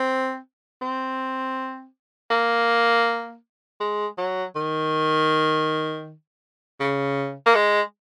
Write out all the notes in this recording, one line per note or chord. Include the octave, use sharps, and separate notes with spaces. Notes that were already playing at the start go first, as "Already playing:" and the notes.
Already playing: C4
C4
A#3
G#3
F#3
D#3
C#3
A#3
G#3